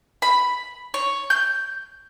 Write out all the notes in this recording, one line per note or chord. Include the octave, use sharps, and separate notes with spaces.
B5
C#5
G6